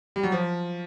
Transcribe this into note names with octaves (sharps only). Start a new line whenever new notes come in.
G3
F#3
F3